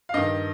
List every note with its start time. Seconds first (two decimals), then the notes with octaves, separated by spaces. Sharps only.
0.09 F5
0.14 G2 D#3 D#5